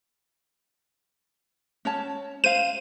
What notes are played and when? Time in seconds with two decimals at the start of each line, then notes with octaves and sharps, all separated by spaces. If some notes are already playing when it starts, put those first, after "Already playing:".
1.85 C#4 C#5 A5
2.44 C5 F5 D#7